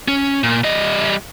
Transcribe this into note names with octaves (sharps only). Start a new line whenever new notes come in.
C#4
A#2
G3 D#5